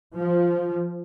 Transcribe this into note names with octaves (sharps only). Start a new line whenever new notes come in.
F3